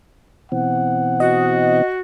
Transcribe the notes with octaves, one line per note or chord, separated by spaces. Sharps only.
B2 E3 C4 F#5
F#4 D#5